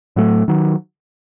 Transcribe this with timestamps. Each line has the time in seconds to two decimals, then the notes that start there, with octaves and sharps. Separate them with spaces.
0.16 A2 F#3 A3
0.48 D#3 F#3